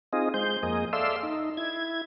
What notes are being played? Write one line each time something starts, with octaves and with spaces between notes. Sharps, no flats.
C4 D#4 F4 G#4 D#5
G#3 C5 G6
F2 A#3 G#4 D#5
A4 D5 E5 F5 C6 E6
D#4
E4 G#6